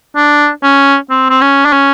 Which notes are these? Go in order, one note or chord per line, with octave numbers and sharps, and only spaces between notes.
D4
C#4
C4
C4
C#4
D4
C#4